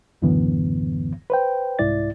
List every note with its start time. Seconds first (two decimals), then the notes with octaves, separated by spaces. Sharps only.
0.22 C#2 F#2 A2 D3 E3 B3
1.30 B4 C5 G5
1.79 C2 G#2 E4 D5 A6